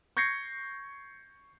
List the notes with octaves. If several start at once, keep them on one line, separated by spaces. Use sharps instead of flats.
C#6 G6 G#6 A#6 C7 C#7